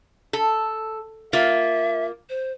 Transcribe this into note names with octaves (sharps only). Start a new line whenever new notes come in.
A4
A#3 F4 E5
C5